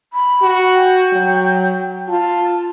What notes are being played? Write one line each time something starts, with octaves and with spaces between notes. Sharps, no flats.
B5
F#4
G5
F#3
F4 A5